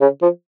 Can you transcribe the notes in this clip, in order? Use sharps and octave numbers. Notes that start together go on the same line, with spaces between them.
C#3
F3